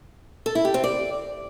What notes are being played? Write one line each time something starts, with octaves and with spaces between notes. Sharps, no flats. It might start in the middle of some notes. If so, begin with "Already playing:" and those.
A4
E4
G4
C4
D5